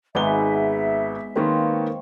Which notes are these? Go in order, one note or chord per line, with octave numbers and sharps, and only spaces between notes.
G#1 G#3 B3 D#4 B4 E5 G7
D#3 A#3 C4 B4 C#5 F5